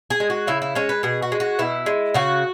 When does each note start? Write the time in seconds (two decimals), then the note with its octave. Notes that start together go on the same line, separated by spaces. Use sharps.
0.10 G#4
0.20 G#3
0.30 F#4
0.47 C#3 E4
0.62 E4
0.75 G#3 C#4
0.89 B4
1.03 B2 G#4
1.22 F#4
1.32 G#3
1.40 F#4
1.59 B2 E4
1.86 G#3
2.14 C#3 F#4